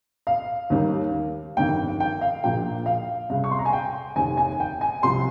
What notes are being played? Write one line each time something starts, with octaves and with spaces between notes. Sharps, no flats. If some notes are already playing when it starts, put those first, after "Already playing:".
F5
D#2 D#3 G3
G1 F2 D#3 G5
G5
F5
A#1 A#2 F3 G5
F5
C#2 C3 G3 F5
C#6
C6
A#5
G#5
G5
F1 D#2 D#3 G#5
G#5
G5
G#5
C2 C3 F3 C6